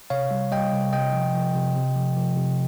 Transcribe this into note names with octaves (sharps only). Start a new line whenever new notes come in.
C3 C#5 F5
G3
G3 D#5 G5
C3
C3 D#5 G5
F3
F3
C3
C3
F3
F3
C3